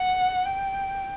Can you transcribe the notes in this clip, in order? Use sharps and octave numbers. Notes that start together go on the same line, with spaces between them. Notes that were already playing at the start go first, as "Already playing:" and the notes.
Already playing: F#5
G5